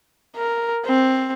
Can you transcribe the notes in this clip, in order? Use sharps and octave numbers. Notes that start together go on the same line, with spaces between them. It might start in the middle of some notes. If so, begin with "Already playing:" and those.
A#4
C4